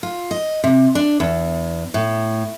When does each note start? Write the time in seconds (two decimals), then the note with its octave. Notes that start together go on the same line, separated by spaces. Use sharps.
0.03 F4
0.31 D#5
0.64 C3
0.95 D4
1.20 E2
1.94 A2